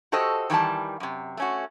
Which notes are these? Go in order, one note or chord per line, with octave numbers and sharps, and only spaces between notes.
F#4 G4 A4 C5 D#5
D#3 E3 G3 A5
F#2 C3
A3 C#4 F#4